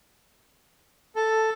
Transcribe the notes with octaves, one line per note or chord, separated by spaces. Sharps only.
A4